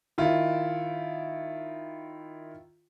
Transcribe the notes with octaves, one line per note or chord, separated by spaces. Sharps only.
D#3 E4 F4